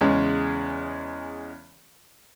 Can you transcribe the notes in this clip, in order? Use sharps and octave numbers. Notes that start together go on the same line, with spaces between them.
E2 C#3 G#3 C#4